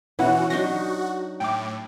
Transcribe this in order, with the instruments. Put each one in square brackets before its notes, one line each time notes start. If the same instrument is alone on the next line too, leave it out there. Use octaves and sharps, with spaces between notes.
[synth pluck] B2 E4 F#5 [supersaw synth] E3 F#4 [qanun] C#4
[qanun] F#3 D4 D#4 [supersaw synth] F#4 [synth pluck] A#6
[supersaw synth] A2 [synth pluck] G5 D6